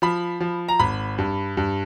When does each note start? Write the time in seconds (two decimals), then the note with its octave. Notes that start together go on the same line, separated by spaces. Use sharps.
0.02 F3 B5
0.40 F3
0.68 A#5
0.79 G#1 B5
1.18 G2
1.57 G2